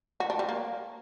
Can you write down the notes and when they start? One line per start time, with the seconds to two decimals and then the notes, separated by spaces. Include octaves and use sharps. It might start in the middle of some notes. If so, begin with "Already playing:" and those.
0.20 F#4
0.30 D4
0.39 G3
0.49 A#3